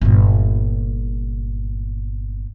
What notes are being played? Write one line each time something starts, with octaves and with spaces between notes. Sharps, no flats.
G1 A#2